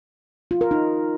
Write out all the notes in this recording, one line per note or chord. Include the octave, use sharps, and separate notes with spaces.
F4
A#4
D#4